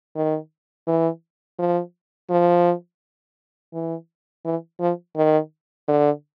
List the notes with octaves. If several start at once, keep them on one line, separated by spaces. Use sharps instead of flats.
D#3
E3
F3
F3
E3
E3
F3
D#3
D3